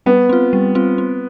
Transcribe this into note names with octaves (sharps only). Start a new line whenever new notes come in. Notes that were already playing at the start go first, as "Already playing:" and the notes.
G3 B3
C4 F4
G3
C4 F4
C4